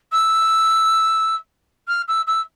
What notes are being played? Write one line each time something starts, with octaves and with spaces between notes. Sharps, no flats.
E6
F6
E6
E6